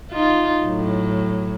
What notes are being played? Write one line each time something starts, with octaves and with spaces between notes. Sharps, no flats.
D#4 F4
A2 F#3